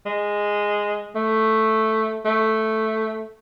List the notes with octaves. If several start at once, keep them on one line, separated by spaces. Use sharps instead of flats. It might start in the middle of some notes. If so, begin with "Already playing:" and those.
G#3
A3
A3